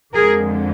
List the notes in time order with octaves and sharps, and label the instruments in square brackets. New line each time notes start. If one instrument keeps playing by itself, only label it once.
[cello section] F2 D3 F3 G#3 G#4 A#4